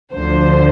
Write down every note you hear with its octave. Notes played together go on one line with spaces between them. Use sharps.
D2 D3 F3 C5